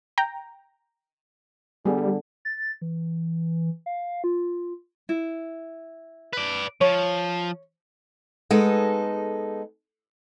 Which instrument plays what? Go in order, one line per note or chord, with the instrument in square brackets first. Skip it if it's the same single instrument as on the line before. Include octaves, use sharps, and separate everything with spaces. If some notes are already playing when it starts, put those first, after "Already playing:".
[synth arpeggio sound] G5 A#5
[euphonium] D3 [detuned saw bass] G3 [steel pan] B3 G#4
[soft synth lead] A6
E3
F5
F4
[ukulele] E4
[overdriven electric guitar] B4 D5
[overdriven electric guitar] F3 [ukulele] C#5
[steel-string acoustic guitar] G#3 B3 D#4 A4